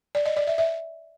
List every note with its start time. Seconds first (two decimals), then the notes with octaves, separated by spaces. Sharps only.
0.15 D5
0.26 D#5
0.36 D5
0.47 E5
0.58 E5